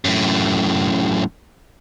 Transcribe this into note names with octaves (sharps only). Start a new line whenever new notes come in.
F#2 A2